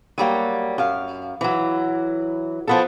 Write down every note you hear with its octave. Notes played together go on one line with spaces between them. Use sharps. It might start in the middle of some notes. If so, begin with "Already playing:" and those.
F#3 G3 A#3
F#2 F5
E3 F#3
F3 B3 A4